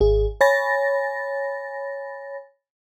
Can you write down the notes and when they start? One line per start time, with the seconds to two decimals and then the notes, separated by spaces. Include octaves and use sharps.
0.01 G#1 G#4
0.41 C#5 G#5 B5 A6 A#6